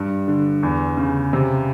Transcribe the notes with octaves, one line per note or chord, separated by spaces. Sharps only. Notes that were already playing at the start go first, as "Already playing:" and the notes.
Already playing: G2
D3
E2
C#3
C3